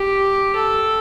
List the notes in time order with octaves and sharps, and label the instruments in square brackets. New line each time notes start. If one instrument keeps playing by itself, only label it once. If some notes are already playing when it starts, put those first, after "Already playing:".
Already playing: [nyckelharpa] G4
A4